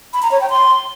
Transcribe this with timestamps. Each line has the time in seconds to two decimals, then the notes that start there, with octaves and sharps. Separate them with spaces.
0.13 B5
0.22 A#5
0.32 C#5
0.41 G5
0.50 C6